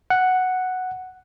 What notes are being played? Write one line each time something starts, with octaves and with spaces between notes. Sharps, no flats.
F#5